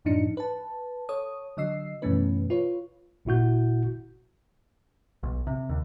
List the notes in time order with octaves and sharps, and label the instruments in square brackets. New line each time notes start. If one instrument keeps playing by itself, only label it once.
[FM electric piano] F#2 A2 F3 D4 D#4 C#7
B4 A5
A4 C#5 D#6
D3 F#3 D#5 E6 C7
F#2 B2 E3 A3 C#4 B4
F4 B4 C#5
[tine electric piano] G1 A#2 E4 F#4 G6
[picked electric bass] B1
C3
D#2